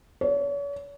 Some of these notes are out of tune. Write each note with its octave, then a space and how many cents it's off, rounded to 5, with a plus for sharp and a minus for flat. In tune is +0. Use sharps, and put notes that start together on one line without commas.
C#5 +40